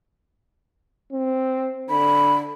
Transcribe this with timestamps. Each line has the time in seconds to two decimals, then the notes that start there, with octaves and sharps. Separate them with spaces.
1.12 C4
1.90 D3 B5